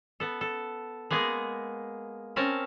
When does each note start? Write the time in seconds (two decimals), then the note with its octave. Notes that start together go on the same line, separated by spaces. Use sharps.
0.20 B3 A4
0.41 A4
1.10 G#3 A#3 B3 G#4
2.36 C4 C#4 A#4 A5